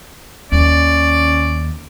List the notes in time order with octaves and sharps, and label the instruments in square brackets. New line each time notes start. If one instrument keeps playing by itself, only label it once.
[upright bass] D#2 [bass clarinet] C#4 [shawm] D5